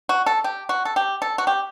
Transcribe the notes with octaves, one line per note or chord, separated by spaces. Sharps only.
F#4
A4
G4
F#4
A4
G4
A4
F#4
G4